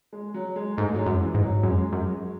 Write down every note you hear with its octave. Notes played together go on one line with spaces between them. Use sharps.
G#3
F#3
G#3
G#2 A3
F#3
G#3
F#2
E3
G#2
F#3
F#2 G#3
F#2